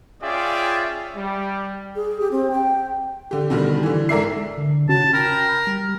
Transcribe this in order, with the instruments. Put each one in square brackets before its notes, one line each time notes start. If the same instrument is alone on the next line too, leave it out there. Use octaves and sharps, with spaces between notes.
[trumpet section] C#4 F4 G#4 D5 E5 G5
G3
[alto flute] G#4
G4
C4
G5
[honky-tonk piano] D3 G4
B2 D3 D#3 G3
D3 E3
G#2 A4 A#4 D5 E5 C7
[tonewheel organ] D3
[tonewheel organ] C#3 C#4 F#4 [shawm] A5
[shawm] A#4 [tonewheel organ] G5 B5
[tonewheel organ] G3